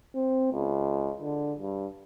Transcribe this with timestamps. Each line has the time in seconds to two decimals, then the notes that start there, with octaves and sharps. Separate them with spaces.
0.15 C4
0.53 C#2
1.22 D3
1.59 G2